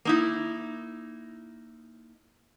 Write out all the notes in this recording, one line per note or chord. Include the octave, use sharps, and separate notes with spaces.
A#3 D#4 E4